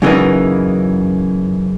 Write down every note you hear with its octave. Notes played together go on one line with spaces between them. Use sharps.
F#2 C#3 E3 A#3 D#4